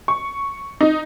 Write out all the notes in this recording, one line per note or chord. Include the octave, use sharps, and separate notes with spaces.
C#6
D#4